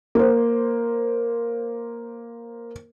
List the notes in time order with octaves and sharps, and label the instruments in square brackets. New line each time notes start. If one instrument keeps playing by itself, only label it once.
[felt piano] A#3 C5